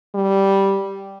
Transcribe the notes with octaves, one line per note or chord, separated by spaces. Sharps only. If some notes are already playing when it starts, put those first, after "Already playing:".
G3